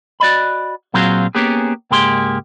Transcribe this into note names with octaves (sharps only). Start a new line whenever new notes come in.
F#4 D5 D#5 B5
A#2 F#3 C4 F4 F#4 G#4
A#3 B3 C#4 G4 G#4
C#2 G#2 A#3 G4 G#4 C6